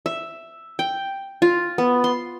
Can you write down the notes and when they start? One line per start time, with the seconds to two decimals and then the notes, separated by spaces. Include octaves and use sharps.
0.06 E5
0.79 G5
1.42 F4
1.78 B3
2.04 C6